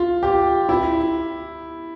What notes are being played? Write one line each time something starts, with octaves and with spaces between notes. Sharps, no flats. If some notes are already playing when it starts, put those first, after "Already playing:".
Already playing: F4
G4
E4